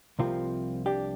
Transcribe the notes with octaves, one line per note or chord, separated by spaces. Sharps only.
C2 C3 F3 A#3 C4 F4
D4 G4